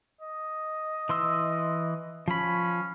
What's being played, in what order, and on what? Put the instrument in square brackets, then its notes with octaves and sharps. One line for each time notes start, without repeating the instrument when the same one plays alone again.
[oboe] D#5
[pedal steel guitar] E3 C6 E6
[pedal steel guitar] F3 B5 [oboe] C#4